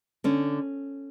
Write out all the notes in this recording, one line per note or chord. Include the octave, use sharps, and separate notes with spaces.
D3 C#4